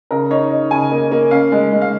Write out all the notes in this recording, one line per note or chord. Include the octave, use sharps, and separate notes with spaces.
C#3 A#4
D#4 C#5
D#4
C#3 G#5
A#3
A#3
C#4 F5
G#3
G#3
F5